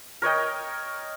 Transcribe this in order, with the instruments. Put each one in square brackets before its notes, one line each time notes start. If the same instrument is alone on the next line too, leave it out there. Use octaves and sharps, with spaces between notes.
[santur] A#4 C#5 D#5 G5